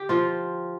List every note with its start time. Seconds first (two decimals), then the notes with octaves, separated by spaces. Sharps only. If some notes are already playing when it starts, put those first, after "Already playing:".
Already playing: D3 G4
0.09 F3 F4